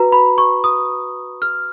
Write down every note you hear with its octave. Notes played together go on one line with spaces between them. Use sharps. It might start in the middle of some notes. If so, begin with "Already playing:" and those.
Already playing: F#4 B4 A#5
B5
C#6
D#6
F6